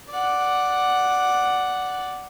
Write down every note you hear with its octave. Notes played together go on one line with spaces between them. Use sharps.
D5 F#5